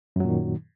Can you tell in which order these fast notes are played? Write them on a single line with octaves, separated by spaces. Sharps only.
F#2 F#3 A#2 D#3